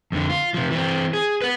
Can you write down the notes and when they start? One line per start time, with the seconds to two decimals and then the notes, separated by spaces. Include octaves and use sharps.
0.12 F2 D3
0.29 F4
0.54 C3 F3
0.71 E3 C4
1.13 G#4
1.42 B4 F#5